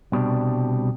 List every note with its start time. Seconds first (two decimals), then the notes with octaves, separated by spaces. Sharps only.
0.12 C2 B2 G3 D4